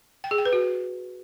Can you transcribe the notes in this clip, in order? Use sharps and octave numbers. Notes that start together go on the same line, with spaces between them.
G5
G#4
G5
B4
F#4